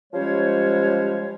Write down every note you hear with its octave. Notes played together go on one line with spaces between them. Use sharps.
F3 G3 G#3 C#4 C5 C#5